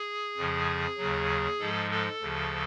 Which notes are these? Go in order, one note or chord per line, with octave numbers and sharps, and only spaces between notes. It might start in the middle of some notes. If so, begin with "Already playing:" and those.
Already playing: G#4
F2 C#3 F3
D#2 C#3 F#3
G#2 F3 G#3 A4
A4
D2 C#3 F3